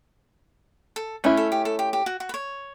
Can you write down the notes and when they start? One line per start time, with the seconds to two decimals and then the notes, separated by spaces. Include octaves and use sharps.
0.96 A4
1.24 A3 C#4 E4 B4
1.37 A4
1.52 G4
1.65 A4
1.79 G4
1.93 G4
2.06 F#4
2.20 F#4
2.29 B4
2.34 C#5